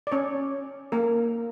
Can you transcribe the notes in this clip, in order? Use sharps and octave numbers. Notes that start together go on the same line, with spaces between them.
D5
C#4 C#5
A#3 A#4